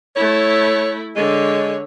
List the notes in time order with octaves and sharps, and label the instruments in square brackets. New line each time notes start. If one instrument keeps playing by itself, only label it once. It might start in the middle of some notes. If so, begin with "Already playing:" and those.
[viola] A3 E4 [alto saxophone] C#5
[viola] D3 C#5 [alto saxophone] G#3